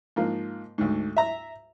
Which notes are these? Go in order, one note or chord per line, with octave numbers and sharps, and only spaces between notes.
G#2 F3 A#3
D2 G#2
E5 A#5